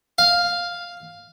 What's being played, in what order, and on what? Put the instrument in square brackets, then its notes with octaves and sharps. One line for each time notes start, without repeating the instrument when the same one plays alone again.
[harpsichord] F5